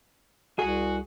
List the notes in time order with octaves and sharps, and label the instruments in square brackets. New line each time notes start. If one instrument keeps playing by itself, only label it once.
[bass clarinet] C2 [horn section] F#4 [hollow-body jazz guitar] G#4